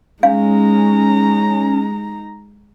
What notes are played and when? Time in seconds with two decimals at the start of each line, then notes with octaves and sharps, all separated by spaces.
0.23 G#3 C#4 D#4 F5 A#5